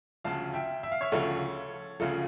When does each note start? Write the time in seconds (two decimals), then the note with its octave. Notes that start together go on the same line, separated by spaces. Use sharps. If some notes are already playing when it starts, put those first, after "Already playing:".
0.24 D2 C#3 F3 F5 A5
0.54 E5 G5
0.83 E5
0.92 F5
1.01 C#5 E5
1.12 D2 C#3 F3 A4 C#5
2.00 D2 C#3 F3 F4 A4